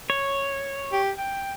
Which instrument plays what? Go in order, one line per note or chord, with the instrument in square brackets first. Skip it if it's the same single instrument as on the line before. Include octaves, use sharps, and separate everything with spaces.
[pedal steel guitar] C#5
[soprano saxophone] G4
G5